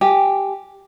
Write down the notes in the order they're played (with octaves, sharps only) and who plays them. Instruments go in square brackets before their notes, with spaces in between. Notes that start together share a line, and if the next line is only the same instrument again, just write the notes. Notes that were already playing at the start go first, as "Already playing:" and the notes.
[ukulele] G4 G#5